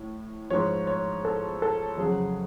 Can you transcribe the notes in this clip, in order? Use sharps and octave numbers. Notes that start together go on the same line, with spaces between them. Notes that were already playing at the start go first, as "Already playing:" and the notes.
Already playing: A2
G#2 F3 C#5
C#5
A4
A4
F2 C#3 F#3 G#4